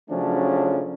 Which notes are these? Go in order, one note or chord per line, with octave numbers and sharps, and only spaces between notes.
C#3 F3 F#3 A3 C#4 D4